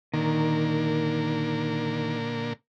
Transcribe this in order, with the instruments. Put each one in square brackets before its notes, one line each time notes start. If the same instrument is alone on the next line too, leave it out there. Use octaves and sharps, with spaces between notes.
[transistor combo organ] A#2 D3 A#3 [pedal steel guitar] D#3